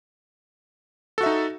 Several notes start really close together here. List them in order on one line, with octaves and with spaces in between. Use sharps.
A4 F#4 E5 D#4